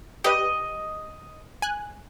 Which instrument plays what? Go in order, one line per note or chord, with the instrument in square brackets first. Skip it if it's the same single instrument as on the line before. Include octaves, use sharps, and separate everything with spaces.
[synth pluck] G4 B4 [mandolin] D#5
[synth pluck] G#5 F#6